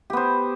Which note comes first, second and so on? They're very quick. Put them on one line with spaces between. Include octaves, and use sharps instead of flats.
G4 B3 C5